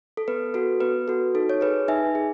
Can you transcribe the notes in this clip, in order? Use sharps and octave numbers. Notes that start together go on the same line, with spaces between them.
A4
B3 B4
F#4 A4
B3 B4
F#4 A4
D#4 A4
C#5
G#4 B4
D#4 E5 G#5
G#4